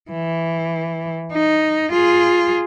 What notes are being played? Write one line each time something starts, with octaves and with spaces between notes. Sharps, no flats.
E3
D#4
F4 G#4